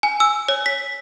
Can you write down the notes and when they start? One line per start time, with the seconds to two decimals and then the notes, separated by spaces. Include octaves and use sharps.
0.03 G#5
0.20 E6
0.49 C#5
0.66 B6